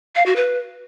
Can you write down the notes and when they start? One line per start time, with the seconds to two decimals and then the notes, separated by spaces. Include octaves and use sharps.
0.16 F5
0.26 F#4
0.36 B4